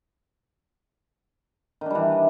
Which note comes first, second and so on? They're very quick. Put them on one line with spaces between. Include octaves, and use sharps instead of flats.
D#3 D4 G3 E3